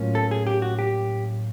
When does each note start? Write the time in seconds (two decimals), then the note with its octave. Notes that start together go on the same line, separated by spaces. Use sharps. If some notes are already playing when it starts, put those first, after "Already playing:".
Already playing: A2 F#3 A#3 C#4 F4
0.15 A4
0.31 G#4
0.47 G4
0.62 F#4
0.79 G4